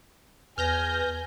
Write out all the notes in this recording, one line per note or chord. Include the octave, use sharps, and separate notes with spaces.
E2 B4 G#5 F6 G6 A#6